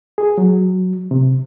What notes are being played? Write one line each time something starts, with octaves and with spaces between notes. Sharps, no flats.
G#4
F#3
C3